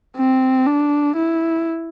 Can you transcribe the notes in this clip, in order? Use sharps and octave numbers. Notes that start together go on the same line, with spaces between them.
C4
D4
E4